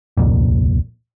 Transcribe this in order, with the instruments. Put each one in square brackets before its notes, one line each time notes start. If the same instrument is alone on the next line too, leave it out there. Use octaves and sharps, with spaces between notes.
[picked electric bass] D1 C2 F2 A#2